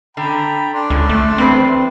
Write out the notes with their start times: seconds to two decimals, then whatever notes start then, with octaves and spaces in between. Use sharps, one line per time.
0.17 D3 G5 A#5 B5
0.74 D4 C6
0.90 C#2 D3
1.09 A3
1.38 E2 C4 B4 C5